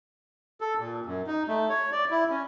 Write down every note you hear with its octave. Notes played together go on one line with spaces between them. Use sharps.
A4
A#2
F#2
D#4
A3
C#5
D5
E4
C#4